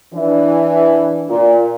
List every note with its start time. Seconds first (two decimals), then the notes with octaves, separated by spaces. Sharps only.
0.14 E3 D4
1.28 A#2